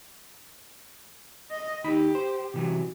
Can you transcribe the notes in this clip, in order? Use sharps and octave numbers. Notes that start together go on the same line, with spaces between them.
D#5
D#2 D#4 G4 B5
C5
C3 E3 F#3